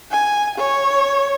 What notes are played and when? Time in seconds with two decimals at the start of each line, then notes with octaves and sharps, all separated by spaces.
0.11 G#5
0.58 C#5